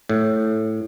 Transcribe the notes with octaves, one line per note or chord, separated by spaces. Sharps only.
A2